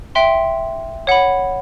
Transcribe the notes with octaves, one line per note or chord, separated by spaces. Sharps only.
E5 G5 C6
C#5 F#5 B5